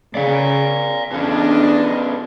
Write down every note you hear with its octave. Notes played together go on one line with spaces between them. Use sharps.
C#3 D5 F5
E2 B2 C#4 D4 D#5